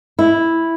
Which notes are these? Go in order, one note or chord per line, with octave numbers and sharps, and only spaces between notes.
E4